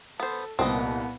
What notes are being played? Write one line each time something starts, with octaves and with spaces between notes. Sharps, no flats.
B3 A4 C5
C2 A#2 B3 C4 D#5